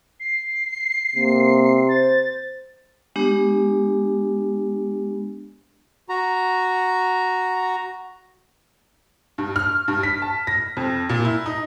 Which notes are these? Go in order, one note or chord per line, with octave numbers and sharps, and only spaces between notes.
C7
C3 A#3
C5 A6
G#3 B3 D4 G4
F#4 A#5
G2
F6
G2
B6
A5
A#6
F2
A#2
E4
D#4